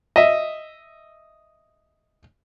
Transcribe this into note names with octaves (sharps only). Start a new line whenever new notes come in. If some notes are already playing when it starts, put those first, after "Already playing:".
D#5 E5